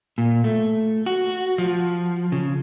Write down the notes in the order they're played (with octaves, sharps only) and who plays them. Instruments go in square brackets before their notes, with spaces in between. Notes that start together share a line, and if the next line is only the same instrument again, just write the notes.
[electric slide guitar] A#2
A3
F#4
F3
C#3